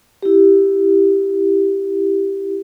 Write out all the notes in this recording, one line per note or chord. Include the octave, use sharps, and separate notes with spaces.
E4 G4